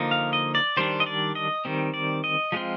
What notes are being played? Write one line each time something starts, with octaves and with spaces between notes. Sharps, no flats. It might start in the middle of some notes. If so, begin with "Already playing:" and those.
Already playing: D3 F3 A#3 D#4
F5
D#5
D5
D#3 G3 D4 C5
D#5
D5
D#5
D#3 G3 C4
D5
D#5
F3 G#3 C4 F4